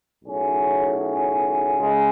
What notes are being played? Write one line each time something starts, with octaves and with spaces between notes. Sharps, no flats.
B1 A2 F#3 C#4 G#4
C#2 C#3 G#3